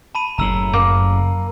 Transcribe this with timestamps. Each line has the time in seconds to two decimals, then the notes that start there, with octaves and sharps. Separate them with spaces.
0.15 A5 B5 D#7
0.38 F#1 A2 A#5 E6 F#7
0.73 F#2 A#3